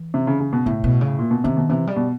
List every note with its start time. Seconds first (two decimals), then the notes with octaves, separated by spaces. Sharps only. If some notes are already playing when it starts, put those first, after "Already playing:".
Already playing: E3
0.14 C3
0.27 C#3
0.40 C#3
0.53 B2
0.66 A2 C#3
0.84 B2
1.01 C#3
1.19 A#2
1.31 B2
1.44 C3 D#3
1.57 B2
1.69 C3 E3
1.87 G3
1.96 B2